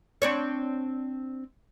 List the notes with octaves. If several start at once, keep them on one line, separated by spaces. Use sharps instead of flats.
C4 D4 C#5